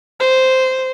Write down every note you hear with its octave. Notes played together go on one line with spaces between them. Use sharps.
C5